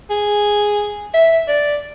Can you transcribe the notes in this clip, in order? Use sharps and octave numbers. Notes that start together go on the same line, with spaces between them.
G#4
E5
D5